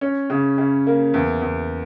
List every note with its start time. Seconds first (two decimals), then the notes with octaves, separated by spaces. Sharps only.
0.01 C#4
0.30 C#3
0.58 C#3
0.87 A#3
1.14 E2
1.42 E2